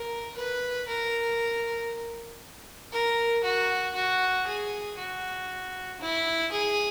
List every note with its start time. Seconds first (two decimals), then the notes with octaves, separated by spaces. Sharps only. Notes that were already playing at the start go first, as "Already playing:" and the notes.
Already playing: A#4
0.36 B4
0.87 A#4
2.92 A#4
3.43 F#4
3.95 F#4
4.46 G#4
4.97 F#4
6.00 E4
6.51 G#4